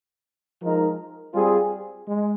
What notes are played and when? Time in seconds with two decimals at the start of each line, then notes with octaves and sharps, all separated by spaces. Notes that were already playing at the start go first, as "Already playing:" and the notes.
0.61 F3 G#3 D#4 A#4
1.34 G3 C4 F4 G#4
2.06 G#3